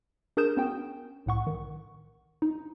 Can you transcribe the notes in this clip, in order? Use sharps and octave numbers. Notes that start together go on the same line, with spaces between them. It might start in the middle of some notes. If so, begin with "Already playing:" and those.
D4 G#4 A#4 D#6 G6 E7
B3 C#4 F#4 G5
B1 A2 F#5 C#6
D#3
D#4